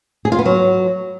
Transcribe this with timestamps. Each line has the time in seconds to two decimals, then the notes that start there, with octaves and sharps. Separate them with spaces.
0.25 G#4
0.32 F4
0.39 B3
0.45 F#3